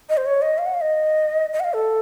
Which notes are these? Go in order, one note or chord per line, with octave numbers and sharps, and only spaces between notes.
D#5
C5
C#5
D#5
F5
F#5
F5
D#5
D#5
F#5
F5
A4